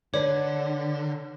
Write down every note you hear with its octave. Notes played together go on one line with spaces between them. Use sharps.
D3 D4 B4 C#5 D5